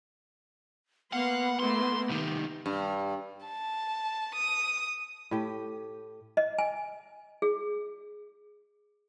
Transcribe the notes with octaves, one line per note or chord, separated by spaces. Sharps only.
A#3 B3 F5 F#5 C6
A3 A#3 E4 C6
C2 D#3 G4
G2
A5
D#6
A2 G4
D#5
G#5
G#4